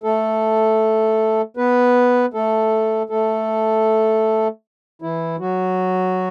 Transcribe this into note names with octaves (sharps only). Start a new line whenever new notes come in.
A3 A4
B3 B4
A3 A4
A3 A4
E3 E4
F#3 F#4